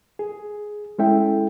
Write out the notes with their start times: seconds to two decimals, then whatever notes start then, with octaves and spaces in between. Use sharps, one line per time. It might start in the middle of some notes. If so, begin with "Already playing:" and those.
0.19 G#4
0.99 G#3 C#4 E4 A4 E5 G5